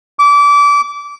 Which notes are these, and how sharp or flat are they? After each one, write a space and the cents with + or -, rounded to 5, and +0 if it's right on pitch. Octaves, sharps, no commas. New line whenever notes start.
D6 -25